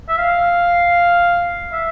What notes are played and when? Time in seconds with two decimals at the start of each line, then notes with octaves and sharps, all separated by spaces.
0.09 E5
0.18 F5
1.72 E5